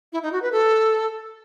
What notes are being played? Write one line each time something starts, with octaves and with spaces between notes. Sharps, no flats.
E4
D#4
F#4
B4
A4